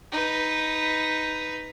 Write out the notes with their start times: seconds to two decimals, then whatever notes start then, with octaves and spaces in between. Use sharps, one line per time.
0.12 D#4 B4